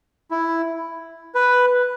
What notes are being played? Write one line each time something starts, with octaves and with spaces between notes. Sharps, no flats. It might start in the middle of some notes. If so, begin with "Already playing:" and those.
E4
B4